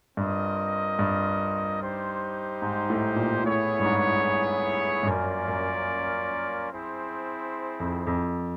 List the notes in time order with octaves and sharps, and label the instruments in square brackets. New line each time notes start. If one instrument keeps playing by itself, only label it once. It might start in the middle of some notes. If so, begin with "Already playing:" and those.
[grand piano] G2 [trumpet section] C4 F4 A#4 D#5
[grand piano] G2
[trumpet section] D#4 G4 C5
[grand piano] G#2
A2
A#2
[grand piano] A2 [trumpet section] B3 E4 G#4 C#5
[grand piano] G2
G#2
G2
[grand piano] F#2 [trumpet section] A#3 C#4 F4 A#4 D5
[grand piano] F#2
[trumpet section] C4 E4 G#4 C5
[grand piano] F2
F2